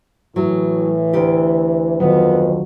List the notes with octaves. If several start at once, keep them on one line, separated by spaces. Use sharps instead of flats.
A2 E3 F#3
D2 G4
F2 D#3 F#3 B3